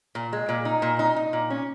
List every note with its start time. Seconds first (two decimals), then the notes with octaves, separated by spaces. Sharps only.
0.15 A#2
0.33 G#3
0.49 A#2
0.65 D#4
0.82 A#2
0.99 D#4
1.16 D#4
1.33 A#2
1.50 C#4